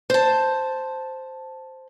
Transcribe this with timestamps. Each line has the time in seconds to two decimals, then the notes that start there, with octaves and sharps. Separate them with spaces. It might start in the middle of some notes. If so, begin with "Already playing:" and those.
0.10 C5 A5